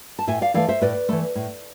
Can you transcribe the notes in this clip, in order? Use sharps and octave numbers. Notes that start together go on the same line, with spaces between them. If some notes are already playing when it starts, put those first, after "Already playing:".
A5
A2 E5 G#5
D5 F5
E3 A3 D5 F5
C5 E5
A2 B4 D5
E3 A3
A2